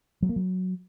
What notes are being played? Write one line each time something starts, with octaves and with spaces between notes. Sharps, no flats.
F#3
A#3
F#3